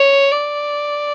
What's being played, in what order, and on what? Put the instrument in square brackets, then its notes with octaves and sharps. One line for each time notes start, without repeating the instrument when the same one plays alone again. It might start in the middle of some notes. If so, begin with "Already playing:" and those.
Already playing: [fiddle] C#5
D5